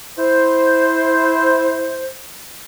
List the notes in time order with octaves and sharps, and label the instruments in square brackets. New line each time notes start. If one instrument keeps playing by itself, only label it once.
[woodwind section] E4 C5